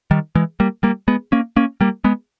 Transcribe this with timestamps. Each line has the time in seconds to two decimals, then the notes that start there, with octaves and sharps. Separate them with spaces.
0.11 D#3 G3
0.36 E3 G#3
0.60 G3 A#3
0.83 G3 A#3
1.08 G#3 B3
1.32 A#3 C#4
1.56 A#3 C#4
1.81 G3 A#3
2.04 G#3 B3